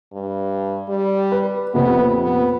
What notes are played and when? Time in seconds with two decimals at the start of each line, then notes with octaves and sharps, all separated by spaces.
0.12 G2
0.89 G3
1.32 B4
1.74 A#1 F2 C3 B3
2.22 B3